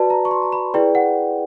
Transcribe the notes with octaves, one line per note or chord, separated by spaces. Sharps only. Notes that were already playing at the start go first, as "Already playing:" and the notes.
Already playing: F#4 B4 D5 A5
A#5
C#6
C6
A#5
B5
E4 G#4 B4 D5 G5
F#5